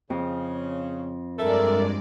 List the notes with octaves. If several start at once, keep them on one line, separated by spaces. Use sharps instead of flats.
F2 C#3
G2 G#3 A4 A#4 D5 E5